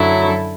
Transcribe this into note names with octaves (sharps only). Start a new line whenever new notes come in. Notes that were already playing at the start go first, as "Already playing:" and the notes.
Already playing: F#2 D3 F#3 E4 A4